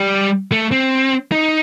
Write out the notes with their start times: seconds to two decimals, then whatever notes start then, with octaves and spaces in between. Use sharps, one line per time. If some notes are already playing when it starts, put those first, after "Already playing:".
Already playing: G3
0.52 A3
0.72 C4
1.32 D#4